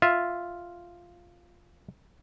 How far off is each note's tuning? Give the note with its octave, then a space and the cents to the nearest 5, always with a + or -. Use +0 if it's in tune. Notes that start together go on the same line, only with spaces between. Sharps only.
F4 +0 E5 +0